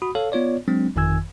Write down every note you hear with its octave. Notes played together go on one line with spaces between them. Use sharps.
F#4 B5 D#6
A4 C#5 F5
B3 F4 C#5 D5
F#3 G#3 C4 D4
G1 F2 D#3 G#5 E6 G#6